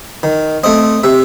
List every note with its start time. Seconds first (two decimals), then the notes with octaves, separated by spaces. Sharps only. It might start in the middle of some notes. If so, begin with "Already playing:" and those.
0.23 D#3
0.64 A3 C4 D#5
1.03 C3 E5